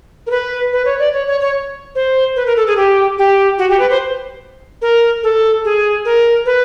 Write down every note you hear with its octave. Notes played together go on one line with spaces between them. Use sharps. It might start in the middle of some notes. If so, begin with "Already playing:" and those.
A#4
B4
B4
C#5
D5
C#5
C#5
C#5
C5
B4
A#4
A4
G#4
G4
G4
F#4
G4
B4
C5
A#4
A4
G#4
A#4
B4